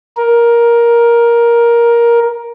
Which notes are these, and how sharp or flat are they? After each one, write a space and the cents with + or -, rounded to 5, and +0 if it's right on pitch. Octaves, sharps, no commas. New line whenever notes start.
A#4 +10